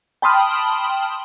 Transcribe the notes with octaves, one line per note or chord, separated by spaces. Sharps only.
G5 A5 B5 C6 D#6 F6